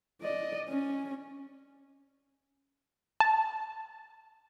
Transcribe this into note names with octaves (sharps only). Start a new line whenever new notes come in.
D5 D#5
C#4
A5